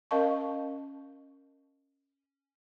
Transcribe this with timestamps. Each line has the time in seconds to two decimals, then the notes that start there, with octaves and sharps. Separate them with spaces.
0.11 C#4 A#4 D#5 F5 A5 C#6